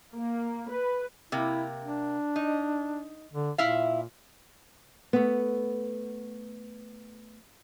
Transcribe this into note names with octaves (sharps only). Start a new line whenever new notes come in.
A#3
B4
C3 A#3 E4
D4
D#4
D3
A#2 E4 E5 F5
A3 B3